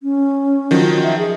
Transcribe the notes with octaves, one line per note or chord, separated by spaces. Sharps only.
C#4
D#3 F3 F#3
E5
G#4